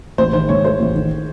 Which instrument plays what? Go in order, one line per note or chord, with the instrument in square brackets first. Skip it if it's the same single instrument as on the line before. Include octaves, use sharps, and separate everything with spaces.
[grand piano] A1 [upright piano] C5
[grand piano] D#3 [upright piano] C5
[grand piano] G#2 [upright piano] C#5
[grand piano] A3 [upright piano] C5
[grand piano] A1
D#3